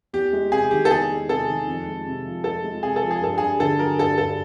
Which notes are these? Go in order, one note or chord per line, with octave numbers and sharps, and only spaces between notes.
E2 G4
G#3
C3 G#4
D#3 G4
A4
E2 G#4
G#3
C3 A4
D#3
F2
G#3
C3
F3
F2 A4
G#3
C3 G#4
A4
F3
G#4
G2 A4
G2 G#4
D3 A4
F#3 A#4
G2 A4
G2 A4